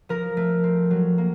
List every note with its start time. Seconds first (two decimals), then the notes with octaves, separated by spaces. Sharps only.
0.09 F3 A#4
0.37 A3
0.64 C4
0.91 F#3
1.18 A#3